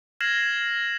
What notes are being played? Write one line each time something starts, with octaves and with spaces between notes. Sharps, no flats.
F6 G#6 A#6 C7 E7 F#7